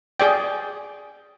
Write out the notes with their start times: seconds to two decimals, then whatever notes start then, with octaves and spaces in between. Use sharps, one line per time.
0.20 G#4 D5 G5